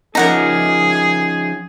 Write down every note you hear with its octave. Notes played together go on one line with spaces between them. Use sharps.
F3 C#4 D#4 G#4 A#4 F#5 A#5